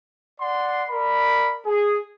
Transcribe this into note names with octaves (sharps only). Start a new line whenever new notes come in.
D5 F#5 C6
A#4 D5 B5
G#4